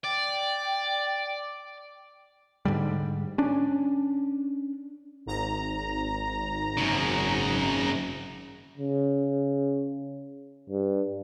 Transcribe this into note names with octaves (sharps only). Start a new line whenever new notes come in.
D5 G5
G#2 D3 G3
C#4 D4
G#1 A#5
F#2 C#3
C#3
G2